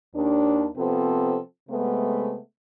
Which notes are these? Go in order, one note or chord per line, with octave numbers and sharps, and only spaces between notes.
D#2 D4
C3 F3 B3 C4 A4
C3 G#3 A3 B3